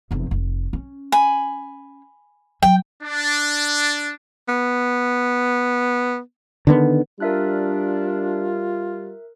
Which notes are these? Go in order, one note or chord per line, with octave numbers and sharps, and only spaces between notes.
F1 E2
F1
C#4
G#5 B5
F#3 G5
D4
B3
D3 D#3 B3
G3 D4 F4 A#4 E5 F#6